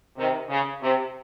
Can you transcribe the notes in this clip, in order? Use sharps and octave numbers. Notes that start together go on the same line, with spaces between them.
C3 D#3
C#3
C3